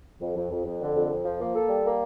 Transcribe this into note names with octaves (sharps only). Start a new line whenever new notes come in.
F2
F2
F2
F2
D3
F2
F2
F3
A#3
A4
G3
A#3